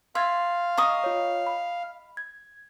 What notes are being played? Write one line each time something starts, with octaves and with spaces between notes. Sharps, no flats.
E5 F5 C6 G#6 A6
D#5 A#5 C#6 D#6
F4 C#5
B5
G#6